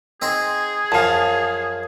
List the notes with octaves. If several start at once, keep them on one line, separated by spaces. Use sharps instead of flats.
C4 D#4 G#4 C5
F#2 F3 F5 G#5 A5